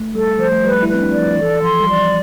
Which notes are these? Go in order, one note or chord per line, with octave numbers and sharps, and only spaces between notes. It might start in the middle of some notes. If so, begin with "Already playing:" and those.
Already playing: A3
G3 A4
F3 C5
A3
G3 B4
E4
C4 B4
D4
D5
F3
E3 A4
F3 C6
G3
F3 D5